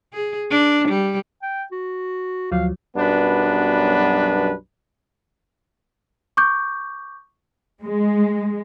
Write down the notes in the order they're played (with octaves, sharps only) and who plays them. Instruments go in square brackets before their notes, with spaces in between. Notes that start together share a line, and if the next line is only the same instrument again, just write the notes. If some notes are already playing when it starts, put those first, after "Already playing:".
[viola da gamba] G#4
D4
G3
[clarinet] G5
F#4
[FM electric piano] D2 F3 F#3 [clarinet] F5
[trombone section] B1 F#2 G3 B3 D4 B4
[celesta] C#6 D6 G6
[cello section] G#3